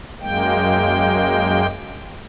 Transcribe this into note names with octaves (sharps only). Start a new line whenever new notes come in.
F#2 G#3 A#3 G5